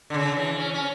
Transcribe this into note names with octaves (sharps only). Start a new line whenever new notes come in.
D3
C#3
E3
C#4
C#4